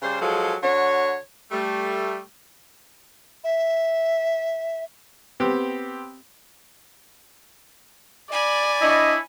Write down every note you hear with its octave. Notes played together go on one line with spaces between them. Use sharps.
C#3 G3 C5
F3 F#3 G#3 G#4 A4
D3 F#4 C#5
G3 A3
E5
B3 C4 G4
D5 G#5 B5
D4 E4 C#5 D#5